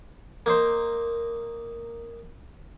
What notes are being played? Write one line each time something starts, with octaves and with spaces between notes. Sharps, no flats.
A#3 D#4 C5